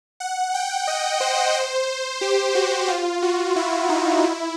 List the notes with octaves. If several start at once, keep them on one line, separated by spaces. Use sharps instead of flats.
F#5
G5
D#5
C5
C5
G4
F#4
F4
F#4
E4
D#4
E4